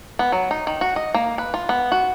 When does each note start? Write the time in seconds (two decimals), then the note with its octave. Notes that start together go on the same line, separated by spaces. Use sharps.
0.19 B3
0.32 F#3
0.51 D#4
0.67 D#3
0.81 F#4
0.96 D#5
1.14 A#3
1.38 B4
1.54 F4
1.69 B3
1.92 F#4